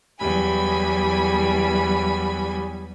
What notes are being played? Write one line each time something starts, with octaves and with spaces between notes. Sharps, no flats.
E2 F#3 G3 G#5 B5